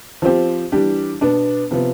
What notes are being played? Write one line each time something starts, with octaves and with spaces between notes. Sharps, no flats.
F3 C4 G4
E3 G3 D4 G4
B2 B3 D4
C3 F3 B3